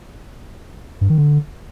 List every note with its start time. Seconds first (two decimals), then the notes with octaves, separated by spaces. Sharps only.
1.01 G2
1.10 D#3
1.18 D3